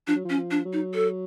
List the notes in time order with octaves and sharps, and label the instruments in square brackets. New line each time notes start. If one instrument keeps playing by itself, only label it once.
[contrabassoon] F3 [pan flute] D4
[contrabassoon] F#3
F3
[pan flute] C#4
[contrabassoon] F3
[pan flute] D4
[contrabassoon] F#3
[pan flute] D#4
A4